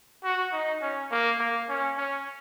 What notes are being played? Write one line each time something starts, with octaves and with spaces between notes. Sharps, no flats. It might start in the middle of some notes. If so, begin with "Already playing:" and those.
F#4
D#4
C#4
A#3
A#3
C#4
C#4